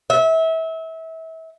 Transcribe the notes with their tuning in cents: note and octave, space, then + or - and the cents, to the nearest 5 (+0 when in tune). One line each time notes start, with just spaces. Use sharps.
E5 -30